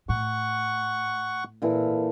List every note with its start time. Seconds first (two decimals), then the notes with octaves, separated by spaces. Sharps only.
0.09 A2 F#5 C#6
1.62 A#2 E3 A4